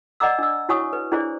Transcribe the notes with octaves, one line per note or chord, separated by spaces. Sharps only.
D5 D#5 F#5 A#5 D6 E6
D4 E6
E4 F#4 C#5 G#5 C#6 D#6
B4
D4 E4 G#4 C5 D5